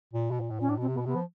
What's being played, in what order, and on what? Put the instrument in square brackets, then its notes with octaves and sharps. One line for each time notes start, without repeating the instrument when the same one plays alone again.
[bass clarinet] A#2
B2
A#2
A2
[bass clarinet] A#2 [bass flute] C#4
[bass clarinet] A2 [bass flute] D4
[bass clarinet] B2 [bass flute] C4
[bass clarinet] C3
[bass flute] B3
[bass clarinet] B2
[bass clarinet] C3 [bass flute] B3
[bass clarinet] F3